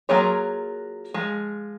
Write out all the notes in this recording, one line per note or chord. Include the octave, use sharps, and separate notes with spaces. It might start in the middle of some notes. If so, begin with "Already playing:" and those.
F#3 A#3 F4 G#4 C#5
F3 G#3